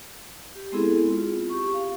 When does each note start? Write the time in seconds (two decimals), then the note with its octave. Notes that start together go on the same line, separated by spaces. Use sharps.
0.55 G4
0.72 G#3 B3 C4 E4 G#4 A4
1.10 C4 F4
1.50 G4 C#6
1.74 F5